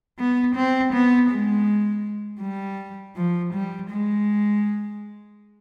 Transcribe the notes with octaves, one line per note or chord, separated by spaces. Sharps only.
B3
C4
B3
G#3
G3
F3
G3
G#3